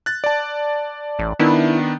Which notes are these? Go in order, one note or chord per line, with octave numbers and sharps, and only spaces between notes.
F#6 A6
D5 A5
A1
D#3 B3 D4 E4